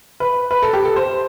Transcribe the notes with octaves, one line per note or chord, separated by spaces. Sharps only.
B4
B4
A4
G4
A4
C5